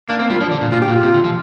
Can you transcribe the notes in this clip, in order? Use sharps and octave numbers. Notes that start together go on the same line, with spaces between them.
A#3 D4
A#3 C4
G3 F4
F3 D4
D3
A#2
A#2 F4
G4
A#2
F4
C3
D3
F3